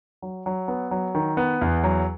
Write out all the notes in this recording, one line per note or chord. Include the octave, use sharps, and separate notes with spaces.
F#3
F#3
B3
F#3
D#3
B3
E2
F#3